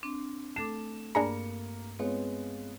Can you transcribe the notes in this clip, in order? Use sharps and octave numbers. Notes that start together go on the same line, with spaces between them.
C4 D4
A3 A4 D6 E7
G2 A#3 D4 G#4 A#5 C#7
G#3 B3 C4 F4 C#5